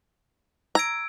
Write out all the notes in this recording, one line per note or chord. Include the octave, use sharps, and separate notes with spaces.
A#5 E6 G#6 D7